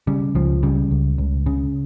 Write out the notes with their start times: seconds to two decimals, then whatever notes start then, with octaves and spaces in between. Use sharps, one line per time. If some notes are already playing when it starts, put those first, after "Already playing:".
0.07 C#3 G3
0.35 C#2 F3
0.63 C#3 G3
0.91 C#2
1.18 C#2
1.46 C#3